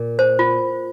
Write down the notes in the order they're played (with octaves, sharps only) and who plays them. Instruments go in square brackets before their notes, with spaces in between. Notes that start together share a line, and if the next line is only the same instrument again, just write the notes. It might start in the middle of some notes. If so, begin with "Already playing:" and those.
Already playing: [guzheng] A#2
[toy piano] C5
F4